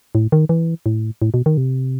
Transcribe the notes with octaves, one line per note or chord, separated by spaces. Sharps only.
A2
D#3
E3
A2
A2
B2
D#3
C3